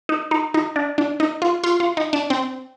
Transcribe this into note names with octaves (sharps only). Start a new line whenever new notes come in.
D#4
D#4
D#4
D4
D4
D#4
F4
F4
F4
D#4
D4
C4